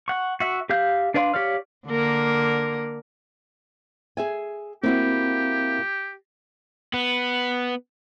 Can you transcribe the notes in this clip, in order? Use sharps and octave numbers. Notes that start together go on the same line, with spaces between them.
F#5 C#6
F#4 E5
G4 E5 F5 G6
D4 B4 D5 F5 C6
G4 C#5 D5 F5 F6
D3 A#3 A#4
G#4 E5 G#5
A#3 C4 E4 F#4 G4
B3